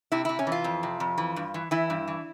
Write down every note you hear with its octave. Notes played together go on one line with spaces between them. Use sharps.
C3 E4
C3 E4
C#4
E3
F4
F2
C3
F2
E3
G2
E3
E3 E4
G2
E3